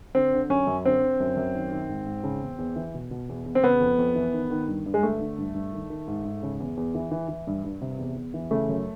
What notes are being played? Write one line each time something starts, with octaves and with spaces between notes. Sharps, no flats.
D3 C4
D3
F#2 C#4
F#2
D3 C4
D3
F#2
F#2
D#3
D#3
G#2
G#2
C#3
E2
E2
E3
B2
B2
E2
E2
C4
C#3 B3
F2
F2
E3
D#3
D#3
G2
G2
G#3
D3 A3
D3
G2
G2
D#3
D#3
G#2
G#2
C#3
E2
E2
E3
E3
E3
G2
G2
C3
E2
E2
E3
C#3 A3
F#2